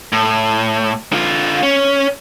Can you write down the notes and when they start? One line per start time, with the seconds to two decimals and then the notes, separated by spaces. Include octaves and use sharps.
0.13 A2
1.12 D3 F4
1.63 C#4